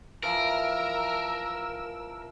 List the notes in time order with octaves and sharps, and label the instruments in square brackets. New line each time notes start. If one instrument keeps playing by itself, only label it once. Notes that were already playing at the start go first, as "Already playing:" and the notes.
[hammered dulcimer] E3 F3 [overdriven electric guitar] A#4 [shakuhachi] A#5 [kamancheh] E6